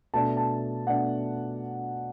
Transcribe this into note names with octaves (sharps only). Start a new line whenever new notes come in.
B2 A3 D4 A5
A5
B2 A3 D4 F#5